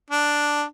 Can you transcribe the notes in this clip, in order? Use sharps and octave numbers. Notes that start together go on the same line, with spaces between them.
D4